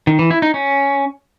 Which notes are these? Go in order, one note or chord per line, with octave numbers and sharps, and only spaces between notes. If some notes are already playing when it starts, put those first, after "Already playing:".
D#3
E3
E4
D#4
C#4